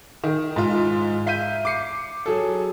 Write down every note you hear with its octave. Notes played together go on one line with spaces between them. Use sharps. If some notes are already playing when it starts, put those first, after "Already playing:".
D#3
G#2 F4
E5 F5 G6 B6 D#7
D6 C7 C#7
F#3 G#4 A4